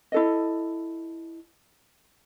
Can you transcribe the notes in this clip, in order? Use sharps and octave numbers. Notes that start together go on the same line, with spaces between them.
E4 A4 D#5